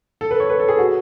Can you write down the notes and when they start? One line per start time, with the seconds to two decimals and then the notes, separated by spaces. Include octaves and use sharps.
0.21 A4
0.31 B4
0.40 C#5
0.50 B4
0.60 A4
0.68 G#4
0.78 F#4